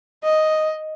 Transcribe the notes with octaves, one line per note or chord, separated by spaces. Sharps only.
D#5